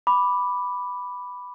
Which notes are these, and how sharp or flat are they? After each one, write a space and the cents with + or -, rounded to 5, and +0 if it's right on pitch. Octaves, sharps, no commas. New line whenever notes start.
B5 +0 D6 +0